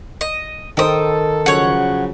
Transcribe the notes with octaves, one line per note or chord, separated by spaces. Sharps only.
D#5
D#3 A4 A#4 C5 G5 D#6
C#3 F3 F#3 C#5 F#5